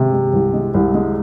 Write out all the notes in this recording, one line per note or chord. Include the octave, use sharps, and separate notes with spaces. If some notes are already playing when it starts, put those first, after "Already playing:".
Already playing: C3 G#3
G#3
C2
G#3
C2
G#3